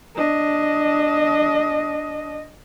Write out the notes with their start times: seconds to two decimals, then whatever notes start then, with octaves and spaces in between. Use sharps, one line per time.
0.15 D4 D#5